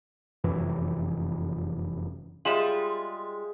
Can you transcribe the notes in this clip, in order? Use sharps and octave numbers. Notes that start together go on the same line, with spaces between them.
F1 F#2 C3 E3
G3 G#3 F4 E5 E7 F#7